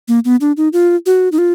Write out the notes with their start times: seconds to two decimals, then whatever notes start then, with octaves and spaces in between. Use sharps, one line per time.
0.08 A#3
0.25 B3
0.41 D4
0.57 D#4
0.73 F4
1.06 F#4
1.32 D#4
1.38 F4